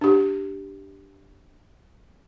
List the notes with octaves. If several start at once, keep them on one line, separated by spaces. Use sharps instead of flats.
D4 G4